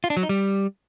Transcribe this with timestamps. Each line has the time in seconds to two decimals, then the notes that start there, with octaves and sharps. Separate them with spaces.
0.04 F4
0.10 D4
0.17 F#3
0.23 D#4
0.29 G3